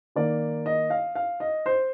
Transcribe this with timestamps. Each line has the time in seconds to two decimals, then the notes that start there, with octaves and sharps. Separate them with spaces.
0.16 D#3 A#3 D5
0.66 D#5
0.90 F5
1.15 F5
1.40 D#5
1.66 C5